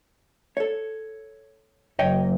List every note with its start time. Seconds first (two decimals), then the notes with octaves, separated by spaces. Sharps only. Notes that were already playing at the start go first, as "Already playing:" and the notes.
0.57 A4 C#5
1.99 F#1 C#5 D#5 G5